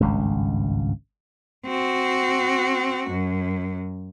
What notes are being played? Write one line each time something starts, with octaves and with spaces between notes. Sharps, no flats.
G#1 C#2 G2
C4 F#4
F#2